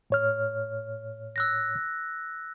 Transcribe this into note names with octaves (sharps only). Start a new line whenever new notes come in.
A2 C#5 F6
E6 F#6 A#6